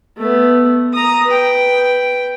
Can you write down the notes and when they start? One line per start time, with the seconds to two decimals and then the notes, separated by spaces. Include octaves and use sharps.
0.17 A3 B3
0.93 A#5 D#6
1.27 B4 G5